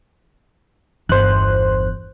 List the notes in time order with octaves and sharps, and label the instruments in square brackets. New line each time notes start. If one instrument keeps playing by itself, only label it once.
[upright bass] G1 E2 [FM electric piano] C5 F#6